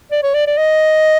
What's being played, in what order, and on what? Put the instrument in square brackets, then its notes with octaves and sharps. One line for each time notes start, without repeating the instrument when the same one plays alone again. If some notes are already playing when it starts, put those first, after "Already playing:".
[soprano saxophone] D5
C#5
D5
D5
D#5